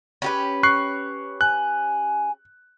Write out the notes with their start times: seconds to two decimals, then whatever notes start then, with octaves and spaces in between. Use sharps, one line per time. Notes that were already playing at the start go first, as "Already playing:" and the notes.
0.22 C#4 G4 B4
0.63 C#6 F#6 C7
1.41 G#5 F#6